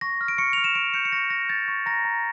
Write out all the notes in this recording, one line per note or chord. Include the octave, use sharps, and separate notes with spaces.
C#6 A#6
F6
D7
C#6 C#7
F6 F7
E7
C#6 D7
G6 C#7
C#7
C#6 A#6
G6 A#6
G6 A6
C#6
A#5 A#6
A#5